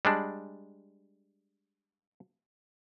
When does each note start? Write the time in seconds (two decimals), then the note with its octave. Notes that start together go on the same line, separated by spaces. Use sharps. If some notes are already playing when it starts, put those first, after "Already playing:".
0.05 G3 G#3 D4